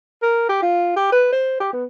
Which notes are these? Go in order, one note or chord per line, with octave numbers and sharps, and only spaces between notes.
A#4
G4
F4
G4
B4
C5
G4
B3